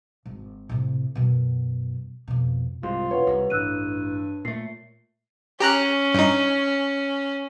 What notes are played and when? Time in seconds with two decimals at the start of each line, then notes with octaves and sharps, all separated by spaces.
0.26 G#1
0.69 A2 C3
1.15 F#2 B2
2.28 F2 B2
2.83 C2 G#2 F4
3.11 E1 B4 C#5 F#5
3.27 C2
3.50 A1 G2 E6 F#6 D#7
4.45 A#2 A3 C7
5.60 C#4 G4 A#5 F#6
6.14 G2 D#4